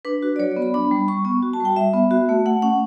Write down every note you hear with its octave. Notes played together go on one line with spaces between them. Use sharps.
D4 B4
F#4
D5
F#3 C#5
B3 D5
B5
D4 B5
G3
G3 C#6
B3
F#4
A5
G3 G5
G3 E5
B3
F#4
A3
A3 F#5
C#4 F#5